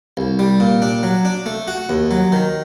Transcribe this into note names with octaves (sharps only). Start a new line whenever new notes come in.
C2
G3
A#2
D4
F#3
D4
A3
F#4
D#2
F#3
D#3